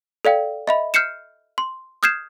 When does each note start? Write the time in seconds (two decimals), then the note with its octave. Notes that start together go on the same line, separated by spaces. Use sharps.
0.25 A4 D5 F5 G5
0.68 D#5 E5 B5
0.94 F6 G6 C7 C#7 E7
1.58 C6
2.03 D#6 F6 G6 G#6 C7 E7